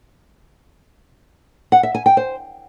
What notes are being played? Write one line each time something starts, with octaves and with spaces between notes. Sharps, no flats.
F#5
E5
G#5
G5
C5